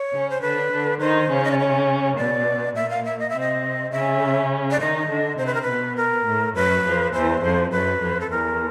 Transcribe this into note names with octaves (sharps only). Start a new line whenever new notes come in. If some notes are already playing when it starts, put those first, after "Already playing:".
Already playing: C#5
C#3 C#4
C5
D3 D4 B4
D3 D4
D#3 D#4 C5
C#3 C#4
D#5
D5
C#5
B2 B3 D5
A#2 A#3 E5
F5
E5
D#5
C3 C4 E5
D#5
C#3 C#4 E5
D5
D#3 D#4 D#5
D3 D4
C3 C4 C5
B4
A#4
B4
B2 B3
A#4
A2 A3
F#2 F#3 B4
F2 F3
E2 E3 C5
F2 F3
F#2 F#3 B4
F2 F3
A4
E2 E3 A#4